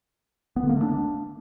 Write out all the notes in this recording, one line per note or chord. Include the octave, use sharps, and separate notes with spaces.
B3
D3
A#3
A3
D4